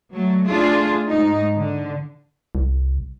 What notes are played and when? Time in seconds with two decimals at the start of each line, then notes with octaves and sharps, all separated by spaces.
0.13 F#3 A3
0.46 A3 D4 F4 G#4
1.09 G#2 D#4
1.57 D3
2.55 C2